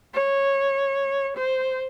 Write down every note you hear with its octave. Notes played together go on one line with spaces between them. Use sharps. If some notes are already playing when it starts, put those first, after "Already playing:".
C#5
C5